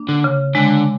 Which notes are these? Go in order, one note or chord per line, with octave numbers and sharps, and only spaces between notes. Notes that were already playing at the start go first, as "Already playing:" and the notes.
Already playing: A#3 D4
D3
C#3
D3 G#3